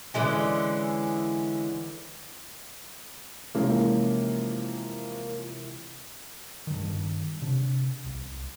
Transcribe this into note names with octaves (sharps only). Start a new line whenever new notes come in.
D3 E3 G#3 C#4
C3 E3 F3 G#3 A#3 C#4
G2 D#3
C3 D4
C2